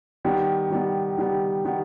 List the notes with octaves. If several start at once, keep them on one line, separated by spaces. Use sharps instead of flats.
D#3 G3 B3
D#3 G3 B3
D#3 G3 B3
D#3 G3 B3